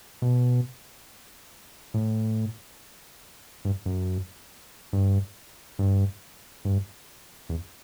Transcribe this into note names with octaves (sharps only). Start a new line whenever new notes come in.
B2
A2
G2
F#2
G2
G2
G2
E2